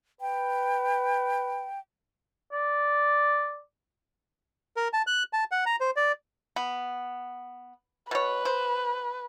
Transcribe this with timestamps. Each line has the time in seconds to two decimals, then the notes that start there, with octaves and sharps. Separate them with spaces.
0.21 B4 G5
2.52 D5
4.77 A#4
4.93 A5
5.07 F#6
5.33 A5
5.51 F#5
5.66 A#5
5.81 C5
5.96 D5
6.56 B3
8.11 B2 B4 C#5
8.45 C5